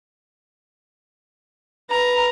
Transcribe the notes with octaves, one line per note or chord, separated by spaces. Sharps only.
B4 A#5